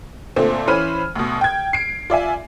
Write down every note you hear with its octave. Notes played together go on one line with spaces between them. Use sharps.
A#2 D3 A3 C4
E3 C#4 C5 B5 F6 D#7
D2 B2
G5 G#6
C7 D7
F4 D5 E5 G#5